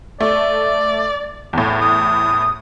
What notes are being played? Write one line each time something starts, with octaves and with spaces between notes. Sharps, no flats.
A3 D5
E2 A2
D#6